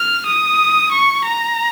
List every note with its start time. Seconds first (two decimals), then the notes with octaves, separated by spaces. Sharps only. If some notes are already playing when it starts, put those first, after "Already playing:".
Already playing: F6
0.26 D#6
0.91 C#6
1.25 A#5